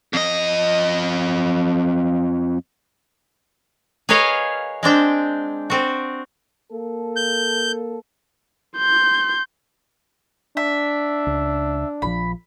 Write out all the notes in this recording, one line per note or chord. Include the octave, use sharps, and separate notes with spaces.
F2 D#5
G#4 A#4 B4 C#5 D#5 F5
G#3 C4 D4 G5
C4 F#4
A#3 A4
G6
C6 G6
D4 E5
C#2
A#1 D#3 F3 B5